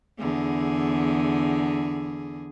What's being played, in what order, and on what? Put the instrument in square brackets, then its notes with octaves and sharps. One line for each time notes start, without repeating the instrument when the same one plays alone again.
[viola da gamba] E2 D3 G#4